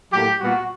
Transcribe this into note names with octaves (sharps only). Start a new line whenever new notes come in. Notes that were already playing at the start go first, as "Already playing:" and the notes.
A2 F#3 A#3 G4
A#2 G3 B3 F#4